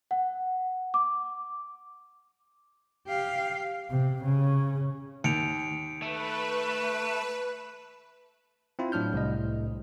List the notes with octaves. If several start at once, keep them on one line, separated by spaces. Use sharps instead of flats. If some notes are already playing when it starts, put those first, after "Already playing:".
F#5
D6
G4 F5
C3
C#3 C#4
D#2 C#7 D7 F7
A3 B4
C4 E4 F4
A2 F#3 D4 F6 G6
C2 A2 D#5